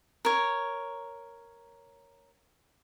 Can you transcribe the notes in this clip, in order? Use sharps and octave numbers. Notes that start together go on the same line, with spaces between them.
A#4 C#5